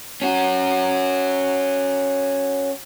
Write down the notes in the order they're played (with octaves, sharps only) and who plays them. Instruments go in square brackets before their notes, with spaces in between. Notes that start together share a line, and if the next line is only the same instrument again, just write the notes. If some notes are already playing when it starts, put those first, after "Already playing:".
[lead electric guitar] C#4 F#4